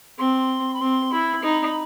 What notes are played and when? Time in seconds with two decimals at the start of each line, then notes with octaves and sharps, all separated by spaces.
0.18 C4 C6
0.74 B5
0.80 C4 C6
1.12 E4 B5
1.43 D#4